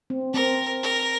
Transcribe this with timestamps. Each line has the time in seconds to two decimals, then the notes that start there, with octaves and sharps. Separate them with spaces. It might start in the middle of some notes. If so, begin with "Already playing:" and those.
0.10 C4
0.34 C4 A#4
0.83 A#4